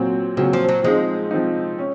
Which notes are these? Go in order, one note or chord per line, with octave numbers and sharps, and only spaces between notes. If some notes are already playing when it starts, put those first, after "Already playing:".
Already playing: A#2 F#3 C4
A#2 C#3 F#3 C4
F3
F#3
F3 G#3 C4 D#4
F3 C4 D#4
C#4